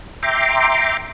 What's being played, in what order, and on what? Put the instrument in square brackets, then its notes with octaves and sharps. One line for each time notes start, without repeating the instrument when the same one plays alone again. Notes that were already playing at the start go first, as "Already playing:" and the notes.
[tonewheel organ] E5 G5 A#5 C6 D6